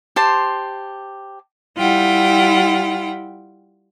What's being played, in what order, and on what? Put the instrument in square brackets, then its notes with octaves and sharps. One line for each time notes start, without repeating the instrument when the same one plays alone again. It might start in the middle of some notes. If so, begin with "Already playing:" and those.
[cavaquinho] G4 C5 A5 C6
[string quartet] G3 E4 F4 F#5 G5